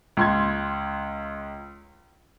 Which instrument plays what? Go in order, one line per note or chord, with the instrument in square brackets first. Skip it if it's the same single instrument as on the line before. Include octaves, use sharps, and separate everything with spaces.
[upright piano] C#2 C6 G#6